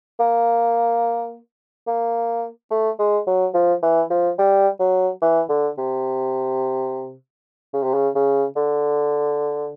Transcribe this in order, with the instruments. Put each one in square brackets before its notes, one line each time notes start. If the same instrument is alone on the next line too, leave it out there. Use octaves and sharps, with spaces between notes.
[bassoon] A#3
A#3
A3
G#3
F#3
F3
E3
F3
G3
F#3
E3
D3
C3
C#3
C3
C#3
C#3
D3